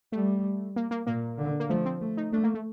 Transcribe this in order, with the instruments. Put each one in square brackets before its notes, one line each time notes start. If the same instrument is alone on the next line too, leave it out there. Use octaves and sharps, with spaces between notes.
[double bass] G3 [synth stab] A3
[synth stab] A#3
A#3
[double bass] A#2 [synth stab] A#3
[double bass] D3
[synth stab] A#3
[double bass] F3 [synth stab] A3
[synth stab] C4
[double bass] A3
[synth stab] D#4
[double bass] A3 [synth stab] D4
[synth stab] A#3
A3